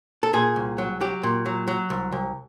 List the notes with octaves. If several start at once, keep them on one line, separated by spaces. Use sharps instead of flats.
A4
A#2 G#4
C2
F#3
F#3 G4
A#2
F#3
F#3
C2
C2